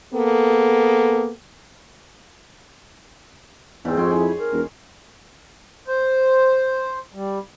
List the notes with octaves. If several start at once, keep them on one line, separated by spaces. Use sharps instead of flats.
A#3 B3 G#4 A4
E2 G#2 C4
F2 F4 C#5 G5 C6
E4 G#4
A#4
E1
C5
G3